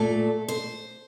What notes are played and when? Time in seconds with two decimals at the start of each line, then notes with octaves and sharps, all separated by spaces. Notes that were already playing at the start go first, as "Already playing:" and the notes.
Already playing: A#2 A3 A4
0.48 C5